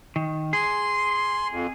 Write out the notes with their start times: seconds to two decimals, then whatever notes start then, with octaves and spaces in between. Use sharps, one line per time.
0.16 D#3
0.53 G#4 C6
1.51 F2